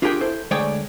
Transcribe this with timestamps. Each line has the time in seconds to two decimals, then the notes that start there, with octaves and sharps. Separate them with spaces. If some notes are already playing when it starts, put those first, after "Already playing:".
0.02 D4 F4 G4 G#4 A#4 G5
0.21 E4 A4 C5
0.51 D2 G#3 C#5 D5 G5 G#5